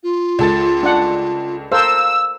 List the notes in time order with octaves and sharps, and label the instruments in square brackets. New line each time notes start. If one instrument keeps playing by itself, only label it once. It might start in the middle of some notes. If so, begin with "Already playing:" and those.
[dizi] F4
[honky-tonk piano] C#2 A4 A6
[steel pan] D4 F#5
[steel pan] A4 A#4 C5 [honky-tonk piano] F5 [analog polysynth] E6